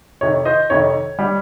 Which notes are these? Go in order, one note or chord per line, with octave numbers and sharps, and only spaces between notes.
F2 C3 D#3 C#5
C5 D#5
F2 C3 D#3 C#5
G3